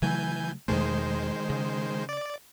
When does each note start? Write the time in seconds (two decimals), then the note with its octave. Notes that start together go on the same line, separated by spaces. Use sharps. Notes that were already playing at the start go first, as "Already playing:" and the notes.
0.02 C#3 E3 F#3 A3 G#5 G6
0.68 E2 B2 D#3 G#3 A3 C5
1.50 C#3
2.09 D5